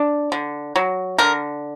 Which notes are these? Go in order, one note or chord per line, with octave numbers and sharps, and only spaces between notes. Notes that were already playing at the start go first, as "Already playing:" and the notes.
Already playing: D4
D3
F#3
D3 A#4